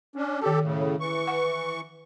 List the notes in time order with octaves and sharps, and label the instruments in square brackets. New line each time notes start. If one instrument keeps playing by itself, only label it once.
[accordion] C#4 D4
[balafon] D#3 A5 [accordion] G4 A4
[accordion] A2 C#3
E3 C#6
[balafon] F#5